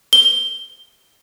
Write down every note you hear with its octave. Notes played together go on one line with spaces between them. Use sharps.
G7